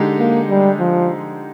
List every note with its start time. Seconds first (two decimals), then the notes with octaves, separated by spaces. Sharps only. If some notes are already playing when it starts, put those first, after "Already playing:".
Already playing: D3 G#3 D#4 G4
0.19 A#3
0.50 G3
0.79 F3